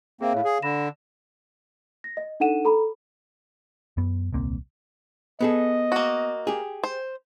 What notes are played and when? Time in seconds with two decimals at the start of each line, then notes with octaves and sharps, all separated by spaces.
0.21 A#3 C4 G#4 E5 F5
0.34 A2 C#5 F5
0.45 G#4
0.62 D3 B5 A#6 E7
2.04 A#6
2.17 D#5
2.40 D4 D#4 A4 F#5 D#7 E7
2.65 A4 A#5 B5
3.97 F#2 B3
4.33 D#1 C2 A#3 C4
5.41 B3 G#4 A4 D#5
5.92 A#3 F#4
6.47 G4 G#4
6.84 C5